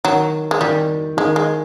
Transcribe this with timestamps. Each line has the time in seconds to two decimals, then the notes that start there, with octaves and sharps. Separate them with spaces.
0.05 D#3 F#3
0.51 G#3
0.61 D#3 G3
1.17 D#3 G#3
1.36 G#3